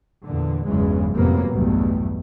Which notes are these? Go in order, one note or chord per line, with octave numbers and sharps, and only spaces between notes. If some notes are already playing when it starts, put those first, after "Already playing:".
E2 A#2 D3
G1 E2 C#3 E3 F#3 G#3
F2 A2 C3 F#3 A#3 B3
B1 E2 G2 B2 G3 A3